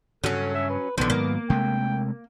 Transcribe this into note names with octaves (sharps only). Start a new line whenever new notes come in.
G2 C#3 F#3 C#4 A4
E5
B4
A#1 D3 D#3 F3 B3
G#2 D#3 F#3 A#3
C3 G#3 A3 G5